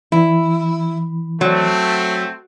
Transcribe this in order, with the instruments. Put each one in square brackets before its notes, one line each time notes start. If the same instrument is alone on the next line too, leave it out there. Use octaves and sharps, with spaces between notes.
[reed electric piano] E3 [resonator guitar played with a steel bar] E4
[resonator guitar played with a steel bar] F#3 [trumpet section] A3 C4